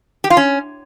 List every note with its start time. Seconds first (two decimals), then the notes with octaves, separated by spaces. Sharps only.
0.24 G4
0.30 F4
0.37 C#4